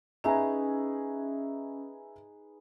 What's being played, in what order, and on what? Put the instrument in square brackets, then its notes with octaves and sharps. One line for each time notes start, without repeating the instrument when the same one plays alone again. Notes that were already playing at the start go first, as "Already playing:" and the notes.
[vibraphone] C#4 [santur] D#4 G#4 B4 [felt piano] E5 G#5 A#5